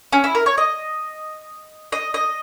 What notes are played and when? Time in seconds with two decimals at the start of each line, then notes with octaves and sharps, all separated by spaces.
0.12 C#4
0.24 E4
0.35 A#4
0.46 C#5
0.58 D#5
1.92 D#5
2.14 D#5